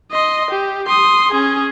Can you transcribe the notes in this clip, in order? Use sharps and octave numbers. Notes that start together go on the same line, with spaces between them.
D#5 C6
G4
C6 D#6
C#4 G#4